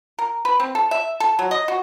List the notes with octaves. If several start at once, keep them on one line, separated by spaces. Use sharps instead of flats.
A#4
B4
C4
A4
E5
A4
F#3
D#5
F#4